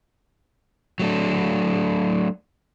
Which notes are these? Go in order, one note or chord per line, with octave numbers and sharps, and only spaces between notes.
F#3 A3 D4